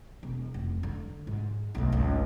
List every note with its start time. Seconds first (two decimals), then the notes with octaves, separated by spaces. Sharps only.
0.23 E1
0.54 F1
0.83 D3
1.27 G#2
1.75 B1 A3
1.92 G#1 C#2